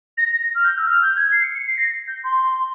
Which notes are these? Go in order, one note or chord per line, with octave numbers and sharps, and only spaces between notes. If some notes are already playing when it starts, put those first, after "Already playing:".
A#6
F6
G6
E6
F6
G6
G#6
C7
C#7
C#7
C7
A#6
G6
C6